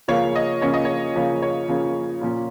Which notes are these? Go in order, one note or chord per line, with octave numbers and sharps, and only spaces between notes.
C#3 F3 A#3 C#4 C#5 F5
D#5
C#3 F3 A#3 C#4 C#5
D#5
C#5
C#3 F3 A#3 C#4
C#5
C#3 F3 A#3 C#4
A#2 F3 A#3 C#4